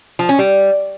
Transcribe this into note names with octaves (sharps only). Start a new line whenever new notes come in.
F3
C#4
G3